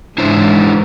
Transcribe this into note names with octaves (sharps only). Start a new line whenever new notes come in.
G#2 C#3 E3 D4 E4 C5